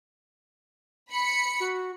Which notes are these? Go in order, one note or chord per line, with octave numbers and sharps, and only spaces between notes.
B5 C#7
F#4